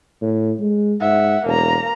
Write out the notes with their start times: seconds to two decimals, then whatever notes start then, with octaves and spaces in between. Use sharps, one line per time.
0.21 A2
0.59 G#3
1.01 G#2 E5 F#5
1.45 E1 A#3 A#5